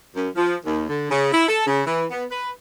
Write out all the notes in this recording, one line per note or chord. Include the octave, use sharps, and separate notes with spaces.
F#2
F3
D#2
D3
C#3
E4
A4
C#3
E3
B3
B4